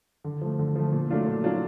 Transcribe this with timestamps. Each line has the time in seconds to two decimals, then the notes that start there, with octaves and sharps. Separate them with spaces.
0.24 D3
0.41 F3 A3
0.59 D3
0.75 F3 A3
0.92 A#2
1.10 F#3 A3 D4 F4
1.26 A#2
1.43 F#3 A3 D4 F4